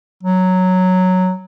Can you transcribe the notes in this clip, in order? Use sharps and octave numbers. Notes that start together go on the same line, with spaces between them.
F#3